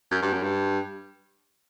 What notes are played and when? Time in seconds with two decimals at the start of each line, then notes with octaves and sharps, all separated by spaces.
0.11 F#2
0.22 G2
0.32 F#2
0.43 G2